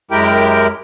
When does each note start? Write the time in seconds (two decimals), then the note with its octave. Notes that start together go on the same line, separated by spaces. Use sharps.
0.11 F#2 G#3 E4 G4 A#4 G5